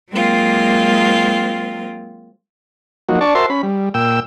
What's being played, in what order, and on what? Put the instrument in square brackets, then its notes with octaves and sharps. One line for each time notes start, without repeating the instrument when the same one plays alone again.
[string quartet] F#3 G#3 A#3 C4 F4
[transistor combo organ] F3 F#3 A#3 D#4 F#4
D4 D5 A5 C#6
F#4 A#4 C5 E5 A5 C6
C#4 B5
G3
A#2 G5 E6